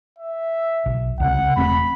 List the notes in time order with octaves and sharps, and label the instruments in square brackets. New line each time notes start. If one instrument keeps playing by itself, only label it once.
[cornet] E5
[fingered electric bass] B1
[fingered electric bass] C#2 C3 [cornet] F#5
[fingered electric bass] E1 A3 C4 [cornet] B5